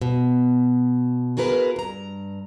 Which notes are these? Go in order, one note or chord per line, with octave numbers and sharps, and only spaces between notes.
B2
F4 F#4 G#4 A#4 B4
G2 A#5